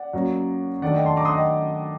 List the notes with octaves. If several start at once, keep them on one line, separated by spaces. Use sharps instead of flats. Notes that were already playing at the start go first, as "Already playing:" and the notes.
Already playing: D5 F#5
F#2 F#3 A#3
D#3 A3 D4 D5 F#5
D#5 G5
A5 C6
A#5 D6
C6 D#6
F#5
D#5 G5